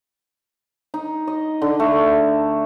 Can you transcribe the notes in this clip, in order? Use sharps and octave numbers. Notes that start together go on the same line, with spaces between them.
D#4
D#5
D3
A3